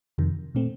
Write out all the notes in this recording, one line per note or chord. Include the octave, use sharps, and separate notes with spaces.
F2 C3 D#3
A#2 A3 C4